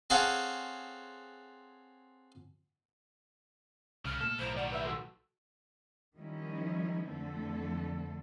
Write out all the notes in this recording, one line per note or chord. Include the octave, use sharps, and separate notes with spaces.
C4 G#4 A4 C#5 F5 F#5
C2 C#3 F6
A#2 A3 A4
B1 A2 E3 A#4 C5
D#3 G3 D5 F#5
B4 E5 E6
F#4 A4 C6
D#3 F3 G3 C#4 E4
F2 D3 E3 A3 C4 A4